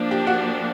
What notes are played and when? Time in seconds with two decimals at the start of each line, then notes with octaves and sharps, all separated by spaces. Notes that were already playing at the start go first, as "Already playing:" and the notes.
Already playing: F3 A#3 D4
0.11 G4 G5
0.27 F#4 F#5